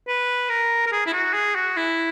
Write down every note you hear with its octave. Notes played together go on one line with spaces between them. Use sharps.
B4
A#4
A#4
G#4
E4
F#4
G#4
F#4
E4